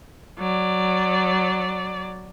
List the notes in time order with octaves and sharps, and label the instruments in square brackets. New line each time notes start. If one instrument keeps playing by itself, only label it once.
[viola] F#3 D5